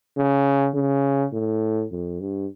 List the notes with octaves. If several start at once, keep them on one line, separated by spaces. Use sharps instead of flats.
C#3
C#3
A2
F2
G2